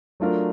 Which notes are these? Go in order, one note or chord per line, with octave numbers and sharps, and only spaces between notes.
F#3 A3 D4 F4 A#4